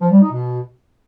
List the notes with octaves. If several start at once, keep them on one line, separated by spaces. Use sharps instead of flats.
F3
G3
D#4
B2